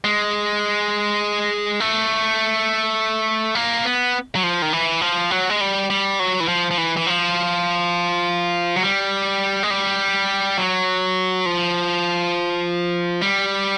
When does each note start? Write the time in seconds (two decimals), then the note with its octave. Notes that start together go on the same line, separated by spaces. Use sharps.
0.04 G#3
1.80 A3
3.55 A#3
3.85 B3
4.35 F#3
4.43 F3
4.62 D#3
4.73 E3
5.01 F3
5.31 F#3
5.50 G#3
5.61 G3
5.90 G3
6.19 F#3
6.40 E3
6.48 F3
6.71 F3
6.78 E3
6.97 E3
7.07 F3
8.76 F#3
8.83 G3
9.63 G#3
9.70 G3
10.58 F#3
11.46 F3
13.22 G3